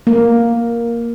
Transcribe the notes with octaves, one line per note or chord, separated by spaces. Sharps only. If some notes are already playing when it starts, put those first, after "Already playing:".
A#3 A#4